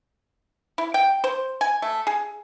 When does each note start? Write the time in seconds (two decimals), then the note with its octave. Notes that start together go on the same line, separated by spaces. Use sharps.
0.78 E4
0.94 G5
1.24 C5
1.61 G#5
1.82 A3
2.07 G#4